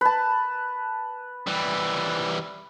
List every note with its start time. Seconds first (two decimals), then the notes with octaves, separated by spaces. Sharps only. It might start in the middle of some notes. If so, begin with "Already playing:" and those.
0.01 B4 A5
1.47 E3 G3